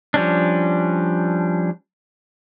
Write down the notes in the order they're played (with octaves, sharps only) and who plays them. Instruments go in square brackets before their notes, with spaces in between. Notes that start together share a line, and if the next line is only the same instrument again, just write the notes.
[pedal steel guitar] F3 G3 C#4 D4